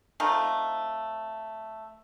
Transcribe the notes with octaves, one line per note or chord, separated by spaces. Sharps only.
A3 C4 D#4 F4